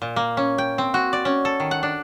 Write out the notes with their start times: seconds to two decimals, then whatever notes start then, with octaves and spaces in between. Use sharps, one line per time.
0.02 A#2
0.16 A#3
0.37 C#4
0.58 G5
0.78 C4
0.94 F#4
1.13 D5
1.25 C#4
1.45 A4
1.60 D#3
1.71 F#5
1.83 D4